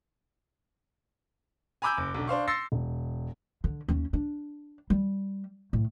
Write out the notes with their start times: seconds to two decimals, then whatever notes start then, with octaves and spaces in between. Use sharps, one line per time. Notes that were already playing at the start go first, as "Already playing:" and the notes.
1.82 G#5 A#5 B5 D6 E6 G6
1.97 F#1
2.15 B1 D3
2.27 D4 C5 F5 C#6
2.47 C6 E6 A6 A#6 C7 C#7
2.72 E1
3.64 D3
3.88 D#2 C#4
4.13 D4
4.90 G3
5.73 A2